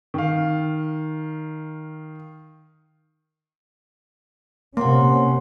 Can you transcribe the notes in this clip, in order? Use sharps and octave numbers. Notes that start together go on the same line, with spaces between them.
D#3 F5
C3 A#3 C#4 F#5 C6